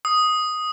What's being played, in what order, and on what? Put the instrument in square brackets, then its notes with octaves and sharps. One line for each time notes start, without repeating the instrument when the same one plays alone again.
[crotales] D#6